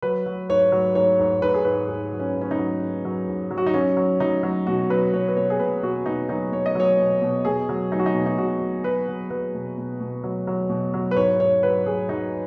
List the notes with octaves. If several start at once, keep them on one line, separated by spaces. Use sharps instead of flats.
F#3 B4
F#3
G#2 C#5
F#3
G#2 C#5
G#2
G#2 B4
G#4
G#2 B4
G#2 G#4
F#3
C#4
G#2
C#4
D#4
F#3
G#2
F#3
G#2
F#3
F#4
D#4
F#3 C#4
F#3
F#3 D#4
F#3
B2 F#4
F#3 B4
B2 C#5
B4
B2 C#5
G#4
B2 B4
B2 F#4
B2 D#4
F#3 D#4
B2 C#5
D#5
F#3 C#5
B2
B2
B2 G#4
F#3
F#3 D#4
F#4
D#4
B2
D#4
B2 F#4
F#3
F#3 B4
F#3
F#3 B4
B2
B2
B2
F#3
F#3
B2
F#3
B4
G#2 C#5
G#2 C#5
F#3 B4
F#3 G#4
F#3 D#4